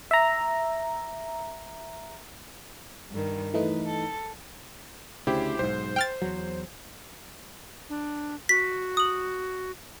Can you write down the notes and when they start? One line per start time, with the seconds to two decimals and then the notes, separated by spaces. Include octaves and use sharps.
0.11 E5 A#5
3.11 G2 D#3
3.54 E3 A3 D#4 B4
3.88 A4
5.27 D2 C#3 E4 G4 C5
5.59 B1 G#2 C5
5.96 G5 F6 A6
6.22 E2 F#3
7.89 D4
8.49 F#4 B6
8.97 D#6 F#7